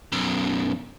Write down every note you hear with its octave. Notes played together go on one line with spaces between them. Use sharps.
B1 F#2